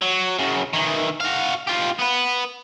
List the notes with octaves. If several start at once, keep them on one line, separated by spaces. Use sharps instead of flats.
F#3
F#2 C#3
D#3 E3
F#4 F5
F4 G4
B3 B4